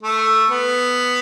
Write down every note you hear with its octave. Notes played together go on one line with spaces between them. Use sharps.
A3
B3